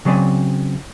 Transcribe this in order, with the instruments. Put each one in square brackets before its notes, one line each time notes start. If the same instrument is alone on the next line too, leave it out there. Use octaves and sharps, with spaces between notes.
[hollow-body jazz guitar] C#3 F#3 C4 D5 G#5